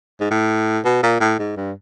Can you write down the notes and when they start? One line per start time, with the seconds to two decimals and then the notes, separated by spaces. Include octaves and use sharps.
0.21 G#2
0.31 A2
0.85 B2
1.03 A#2
1.20 A2
1.39 G#2
1.56 G2